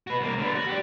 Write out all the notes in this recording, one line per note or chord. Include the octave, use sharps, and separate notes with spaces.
F#4 B4
C2 A#3
D3 B3
F#4
G4 D5